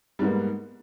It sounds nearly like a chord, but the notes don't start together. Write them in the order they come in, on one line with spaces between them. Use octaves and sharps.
G3 G#2 B3 A#3